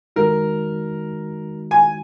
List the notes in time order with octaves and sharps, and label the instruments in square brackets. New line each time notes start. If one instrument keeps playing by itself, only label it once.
[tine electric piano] D#3 G#3 D#4 F#4 [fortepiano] A#4
[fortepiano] G#5